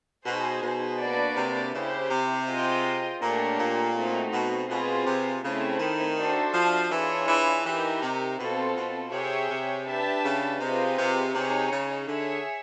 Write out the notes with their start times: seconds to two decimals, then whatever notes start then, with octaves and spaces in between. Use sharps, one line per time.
0.25 B2 D#4 G#4 C5
0.62 B2
1.00 A#3 D4 F#4 B4 D5
1.36 C3
1.73 C#3 E4 G4 C5
2.10 C3
2.47 F4 G#4 C5 D#5 G5
3.21 A#2 A3 D4 G4 A#4 C#5
3.59 A#2
3.95 A3 C4 D#4 F#4
4.33 B2
4.69 B2 C4 F4 G#4 B4
5.06 C3
5.43 C#3 A3 C4 E4
5.80 D#3
6.17 D4 F#4 A4 C5 E5
6.54 F3
6.91 E3 D4 F4 G#4 C#5
7.28 E3
7.65 E3 D#4 G4 A#4
8.02 C3
8.38 B2 C4 F4 A4
8.76 B2
9.12 C3 G#4 C#5 E5 G5
9.50 C3
9.86 D4 G4 B4 E5 A5
10.24 C#3
10.60 C3 C4 F4 G#4 B4 D#5
10.98 C3
11.35 C3 D#4 G#4 C#5
11.72 C#3
12.08 D3 G#4 C#5 E5